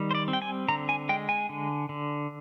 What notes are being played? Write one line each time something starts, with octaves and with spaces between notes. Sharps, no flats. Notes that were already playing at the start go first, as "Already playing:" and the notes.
Already playing: D#3 G3
C5
D5
C4
G5
G#5
D3 A#5
G#5
G#3 G5
G#5
D3
D3